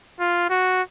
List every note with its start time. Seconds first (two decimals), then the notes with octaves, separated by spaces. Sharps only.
0.20 F4
0.50 F#4